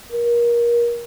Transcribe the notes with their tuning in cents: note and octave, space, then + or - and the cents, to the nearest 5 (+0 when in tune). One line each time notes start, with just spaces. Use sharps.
A#4 +25